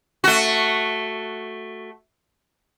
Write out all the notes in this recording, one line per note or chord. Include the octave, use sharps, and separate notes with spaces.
A3 F#4